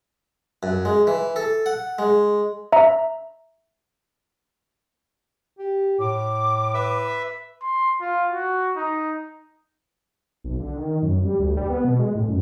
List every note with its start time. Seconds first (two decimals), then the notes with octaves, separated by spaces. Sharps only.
0.63 F#2
0.85 G#3
1.07 E3
1.36 A4
1.66 F#5
1.99 G#3
2.72 E5 A#5
5.59 G4
5.99 A2 D6
6.74 B4 E5
7.62 C6
8.01 F4
8.32 F#4
8.77 D#4
10.44 B1
10.60 D3
10.76 D#3
11.03 F#2
11.24 G3
11.40 D2
11.57 G3
11.70 B3
11.84 B2
11.99 G#3
12.15 A2
12.28 F#2